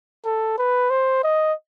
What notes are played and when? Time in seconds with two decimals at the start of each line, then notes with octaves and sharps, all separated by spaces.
0.25 A4
0.58 B4
0.90 C5
1.24 D#5